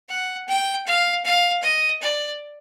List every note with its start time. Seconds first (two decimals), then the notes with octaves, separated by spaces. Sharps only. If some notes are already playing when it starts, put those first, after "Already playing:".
0.09 F#5
0.48 G5
0.87 F5
1.25 F5
1.63 D#5
2.02 D5